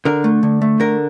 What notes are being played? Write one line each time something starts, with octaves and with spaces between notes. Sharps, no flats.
D3 A#4
A3
D3
A3
D3 A#4